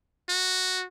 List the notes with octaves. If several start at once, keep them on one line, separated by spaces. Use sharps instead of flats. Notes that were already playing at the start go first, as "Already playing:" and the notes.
F#4